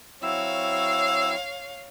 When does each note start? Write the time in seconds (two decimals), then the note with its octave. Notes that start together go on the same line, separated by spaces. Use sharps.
0.22 F#3 C4 E4 C#5 F5 E6